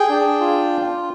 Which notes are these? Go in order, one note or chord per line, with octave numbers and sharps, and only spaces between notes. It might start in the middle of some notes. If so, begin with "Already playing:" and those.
Already playing: G#4 G5
D4
F4